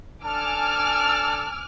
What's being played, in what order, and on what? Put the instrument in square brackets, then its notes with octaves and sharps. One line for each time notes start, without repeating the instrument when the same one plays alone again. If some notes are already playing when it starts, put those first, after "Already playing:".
[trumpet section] D4 A4 A5 [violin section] G#5 D6 F6